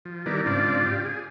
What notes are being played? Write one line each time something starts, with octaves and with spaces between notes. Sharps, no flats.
F3
D#3 G3 B3 E4 A#4 D5
G#2 C#3 C4 D4 F4 D5
F4 G4
G#4